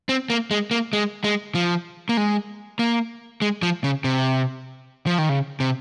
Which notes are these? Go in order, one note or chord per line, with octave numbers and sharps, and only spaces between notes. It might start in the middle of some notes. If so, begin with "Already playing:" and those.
C4
A#3
G#3
A#3
G#3
G#3
F3
A#3
G#3
A#3
G#3
F3
C#3
C3
F3
D#3
C#3
C3